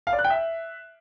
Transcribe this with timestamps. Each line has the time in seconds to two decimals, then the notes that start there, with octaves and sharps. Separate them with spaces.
0.07 F5
0.13 D5
0.19 F#6
0.24 G5
0.30 E5